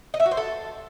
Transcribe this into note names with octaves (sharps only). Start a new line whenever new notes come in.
D#5
E5
F#4
C5
A4